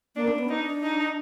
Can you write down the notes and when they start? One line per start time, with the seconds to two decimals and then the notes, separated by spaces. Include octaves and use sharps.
0.16 A#3 D4
0.28 D4
0.39 B3
0.49 D4 D#4
0.82 D#4